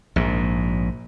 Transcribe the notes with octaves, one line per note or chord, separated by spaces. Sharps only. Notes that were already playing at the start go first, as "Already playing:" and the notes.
A#1 G#2